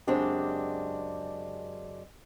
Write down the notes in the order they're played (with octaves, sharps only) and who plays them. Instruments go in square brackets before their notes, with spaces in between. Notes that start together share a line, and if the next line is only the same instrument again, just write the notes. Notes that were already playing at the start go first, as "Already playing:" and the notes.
[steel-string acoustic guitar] F#2 C#3 G#3 C4 D4 G4